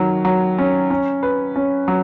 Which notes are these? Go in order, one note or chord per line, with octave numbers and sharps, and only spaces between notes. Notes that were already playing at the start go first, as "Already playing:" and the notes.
Already playing: D#3 F#3
F#3
C#4
C#4
B4
C#4
F#3